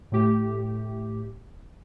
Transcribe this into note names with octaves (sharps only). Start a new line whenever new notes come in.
A2 A3 G4